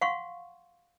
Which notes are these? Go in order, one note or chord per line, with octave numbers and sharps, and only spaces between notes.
F5 F#5 C6 C#6